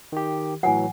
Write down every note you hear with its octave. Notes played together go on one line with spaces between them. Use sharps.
D#3 G4
A2 E3 F#3 F#5 G#5